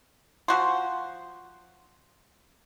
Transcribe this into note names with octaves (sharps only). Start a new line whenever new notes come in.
F3 F#4 C5